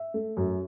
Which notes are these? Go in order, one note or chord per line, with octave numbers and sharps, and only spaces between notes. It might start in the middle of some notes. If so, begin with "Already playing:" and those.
Already playing: E5
A3
F#2